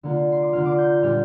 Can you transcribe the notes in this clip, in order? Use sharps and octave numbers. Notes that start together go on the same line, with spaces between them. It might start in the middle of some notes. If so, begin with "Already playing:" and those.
D3 A#3 F4
C6
D6
D3 A#3 F4 F6
D6
G6
G6
A#2 G3 D4 F4 F6